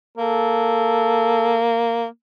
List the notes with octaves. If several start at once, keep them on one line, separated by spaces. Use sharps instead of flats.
A#3 A4